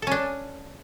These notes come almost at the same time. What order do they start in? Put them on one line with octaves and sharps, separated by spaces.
A4 C#4 D4